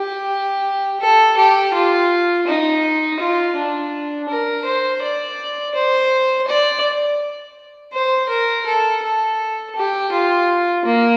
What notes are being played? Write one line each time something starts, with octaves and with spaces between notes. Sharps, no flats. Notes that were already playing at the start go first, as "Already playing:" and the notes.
Already playing: G4
A4
G4
F4
D#4
F4
D4
A#4
C5
D5
C5
D5
C5
A#4
A4
A4
G4
F4
A#3